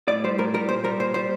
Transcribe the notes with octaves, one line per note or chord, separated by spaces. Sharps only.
A2 D5
G3 C5
A2 A#4
G3 A#4
A#2 C5
G3 A#4
A#2 C5
G3 C5